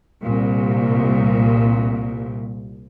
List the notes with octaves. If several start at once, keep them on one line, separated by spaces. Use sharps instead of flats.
C2 A#2